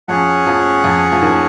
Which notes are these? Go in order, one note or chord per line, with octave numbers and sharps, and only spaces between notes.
F2 F3 C#4 G#4 C#5 F#5
F2 F3
F2 F3
F3
D#2 D#3